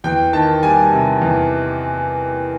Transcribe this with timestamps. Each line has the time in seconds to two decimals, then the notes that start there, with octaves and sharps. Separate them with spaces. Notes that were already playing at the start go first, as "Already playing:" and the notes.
0.04 E2 G5
0.33 D#3 A5
0.62 G3 G#5
0.92 C3
1.21 E2